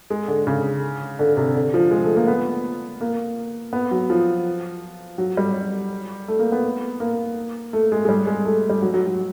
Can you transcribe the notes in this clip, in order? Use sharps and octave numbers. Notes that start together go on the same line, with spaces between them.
G#3
D3
C#3
D3
C3
D3
F3
G#3
A3
A#3
B3
A#3
B3
F#3
F3
F#3
G3
A3
A#3
B3
A#3
A3
G#3
G#3
G3
G#3
A3
G3
F#3
F#3
F#3